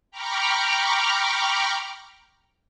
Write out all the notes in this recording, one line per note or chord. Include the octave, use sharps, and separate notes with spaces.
G5 A#5 B5 C#6 D6 F6